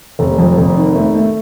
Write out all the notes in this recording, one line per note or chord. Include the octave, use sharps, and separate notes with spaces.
F1
F2
F1
D#3
A3
A3